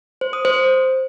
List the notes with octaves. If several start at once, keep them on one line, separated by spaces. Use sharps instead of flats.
C5
D#6
C5